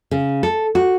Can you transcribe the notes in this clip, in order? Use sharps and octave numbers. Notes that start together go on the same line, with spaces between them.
C#3
A4
F#4